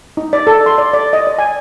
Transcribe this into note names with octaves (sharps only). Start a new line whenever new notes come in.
D#4
D5
A4
C6
D5
D5
D#5
D5
G#5